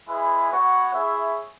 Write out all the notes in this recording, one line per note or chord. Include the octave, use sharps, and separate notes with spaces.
G#3 E4 G#4 B4
B3 F#4 C#5 F#5
E4 G#4 C#5 E5